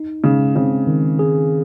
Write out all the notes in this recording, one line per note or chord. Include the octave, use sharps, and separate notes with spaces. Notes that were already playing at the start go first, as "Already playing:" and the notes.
Already playing: D#4
C#3 G#3
C#3 C4
D#3
G#4